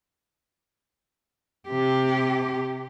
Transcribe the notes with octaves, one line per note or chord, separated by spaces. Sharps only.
C3 G4